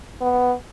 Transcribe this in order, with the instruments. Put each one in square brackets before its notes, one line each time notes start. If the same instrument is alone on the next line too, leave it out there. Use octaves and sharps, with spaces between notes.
[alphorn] B3